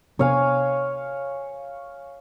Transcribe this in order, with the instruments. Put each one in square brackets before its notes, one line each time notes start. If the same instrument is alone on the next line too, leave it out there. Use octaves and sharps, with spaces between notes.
[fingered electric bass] C3 B3 D4 [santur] C#5 F5 G#5